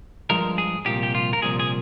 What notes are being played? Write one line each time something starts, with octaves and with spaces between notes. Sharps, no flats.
G2 F3 G#3 A#4
G#4
C2 A#2 F3 G4
G4
F4
A#4
C2 A#2 F3 G#4
G#4